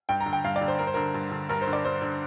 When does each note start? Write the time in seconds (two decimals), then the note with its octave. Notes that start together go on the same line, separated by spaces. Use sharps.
0.09 G2 G5
0.20 A#5
0.26 D3
0.33 G5
0.44 G2 F5
0.56 D5
0.61 D3
0.68 C5
0.79 G2 A#4
0.87 C5
0.94 D3 A#4
1.14 G2
1.31 D3
1.49 G2 A#4
1.62 C5
1.67 D3
1.73 D5
1.84 G2 C5
2.02 D3